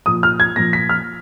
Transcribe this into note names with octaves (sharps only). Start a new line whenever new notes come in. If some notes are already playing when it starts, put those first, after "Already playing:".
A#2 F3 D#6
F6
G#6
A#2 F3 A#6
B6
F6